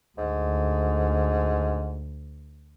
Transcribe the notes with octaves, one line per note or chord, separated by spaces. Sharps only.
D2 G#2